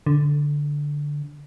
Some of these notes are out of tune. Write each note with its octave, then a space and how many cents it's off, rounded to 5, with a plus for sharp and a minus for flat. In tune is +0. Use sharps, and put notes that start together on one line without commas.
D3 -5